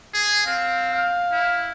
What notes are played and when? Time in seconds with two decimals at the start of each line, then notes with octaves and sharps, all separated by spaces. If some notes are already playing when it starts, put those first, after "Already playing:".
0.14 G#4
0.46 C4 F5
0.94 F5
1.32 E4